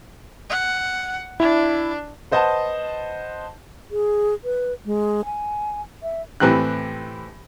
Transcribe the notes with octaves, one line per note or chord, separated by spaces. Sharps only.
F#5
D4 E4
B4 C5 D#5 F#5 A5
G#4
B4
G#3
G#5
E5
A2 E3 C4 G4 F#6